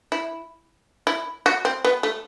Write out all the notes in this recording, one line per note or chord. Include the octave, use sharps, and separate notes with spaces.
E4
E4
F#4
C4
B3
A3